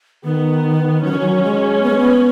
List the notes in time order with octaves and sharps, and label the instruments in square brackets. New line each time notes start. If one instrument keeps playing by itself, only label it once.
[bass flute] D#3 [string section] B3
[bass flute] F#3 [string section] C#4
[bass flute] D#3
F#3
G#3
B3
G#3
B3